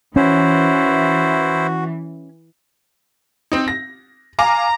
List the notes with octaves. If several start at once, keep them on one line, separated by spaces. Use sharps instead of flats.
E3 C#4 E4 F#4 C5
C4 D#4
A#6
F5 G#5 A#5 D6